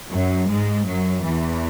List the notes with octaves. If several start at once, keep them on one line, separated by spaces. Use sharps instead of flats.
F#2 F#3
G#2 G#3
F#2 F#3
E2 E3